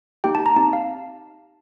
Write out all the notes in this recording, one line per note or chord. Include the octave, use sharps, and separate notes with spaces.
A#3 D#4 G4 G5
A5
A#5
C4 D#4 G4 A5
F5